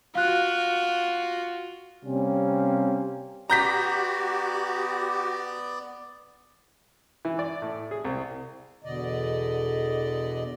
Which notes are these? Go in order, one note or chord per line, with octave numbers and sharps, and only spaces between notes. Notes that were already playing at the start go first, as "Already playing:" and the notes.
F4 F#4 F5 F#6
C3 G3 A#3 C4 C#4
B3 F#4 G4 D5 A#5 G6 B6
E3
D5
A2
G#4
C2
E2 B2 D3 D5 D#5